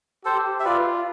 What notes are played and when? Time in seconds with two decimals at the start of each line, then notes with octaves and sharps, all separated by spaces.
0.25 G4 A4 C5
0.60 E5
0.65 F4 B4 D5